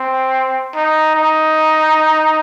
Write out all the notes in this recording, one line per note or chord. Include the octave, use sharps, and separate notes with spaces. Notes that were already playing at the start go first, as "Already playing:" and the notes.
Already playing: C4
D#4
D#4